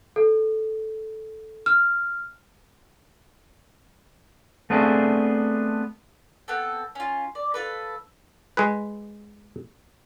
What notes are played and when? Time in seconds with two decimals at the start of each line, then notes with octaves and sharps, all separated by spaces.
0.16 A4
1.66 F6
4.70 A3 B3 C4 D4 G#4
6.48 B3 C4 A4
6.95 C#4 F4
7.35 D5
7.54 F4 A4 B4
8.57 G#3 G#4 B4